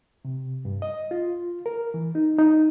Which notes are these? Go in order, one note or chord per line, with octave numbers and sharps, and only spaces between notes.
C3
G2
D#5
F4
A#4
E3
D#4
D#4